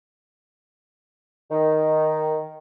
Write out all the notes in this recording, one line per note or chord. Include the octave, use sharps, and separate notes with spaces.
D#3